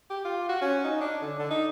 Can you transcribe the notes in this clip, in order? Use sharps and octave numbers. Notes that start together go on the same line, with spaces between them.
G4
F4
F#4
C#4
D#4
D4
D3
D3
D#4